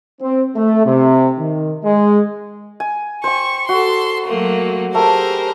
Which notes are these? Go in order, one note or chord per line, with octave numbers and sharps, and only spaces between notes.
C4
A3
C3
D#3
G#3
G#5
C5 G5 C#6
F#4 A4 C6
F#3 A3 A#3
A3 G4 G#4 A#4 C5